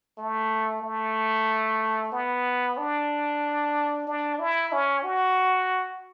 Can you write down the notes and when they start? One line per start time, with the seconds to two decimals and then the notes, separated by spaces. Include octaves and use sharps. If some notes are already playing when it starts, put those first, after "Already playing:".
0.18 A3
0.82 A3
2.12 B3
2.77 D4
4.07 D4
4.39 E4
4.72 C#4
5.04 F#4